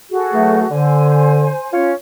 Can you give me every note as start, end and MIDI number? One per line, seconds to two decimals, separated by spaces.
0.10 0.70 66
0.10 0.70 68
0.10 0.70 69
0.33 0.63 52
0.33 0.63 54
0.33 0.63 57
0.71 1.50 50
0.71 1.72 72
0.71 1.72 80
1.73 1.93 61
1.73 1.93 65
1.73 1.93 73